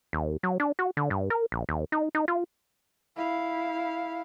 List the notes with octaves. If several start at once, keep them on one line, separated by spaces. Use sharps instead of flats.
D#2
F#3
D4
F#4
D3
G2
A#4
A#1
D#2
D#4
D#4
F4
E4 F5